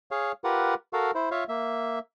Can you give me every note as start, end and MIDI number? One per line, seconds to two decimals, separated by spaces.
0.11 0.32 68
0.11 0.32 73
0.11 0.32 77
0.44 0.74 65
0.44 0.74 67
0.44 0.74 70
0.44 0.74 71
0.44 0.74 78
0.93 1.11 66
0.93 1.11 69
0.93 1.11 70
0.93 1.11 77
1.15 1.29 64
1.15 1.29 72
1.31 1.44 65
1.31 1.44 73
1.31 1.44 76
1.31 1.44 77
1.49 1.99 58
1.49 1.99 76